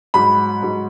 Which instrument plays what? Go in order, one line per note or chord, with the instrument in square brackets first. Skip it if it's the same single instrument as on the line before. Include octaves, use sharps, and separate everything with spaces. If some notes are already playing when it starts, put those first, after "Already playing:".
[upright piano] G#2 F#3 B5
G#2 F#3